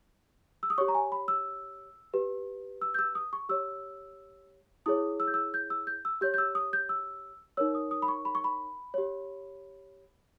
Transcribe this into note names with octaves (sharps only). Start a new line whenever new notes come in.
E6
D#6
G4 C#5 C#6
A#5
G#5
B5
E6
G4 B4
E6
G6
E6
D#6
C#6
G4 C#5 E6
E4 G#4 C#5 D#6
E6
G6
E6
G6
E6
G6
E6
G4 C#5 G6
G6
E6
D#6
G6
E6
D#4 A#4 C#5 E6
D#6
D#6
B5
C#6
B5
C#6
B5
G4 C#5